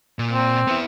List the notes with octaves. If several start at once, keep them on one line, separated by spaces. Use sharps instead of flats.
A#2
C4
B3 E4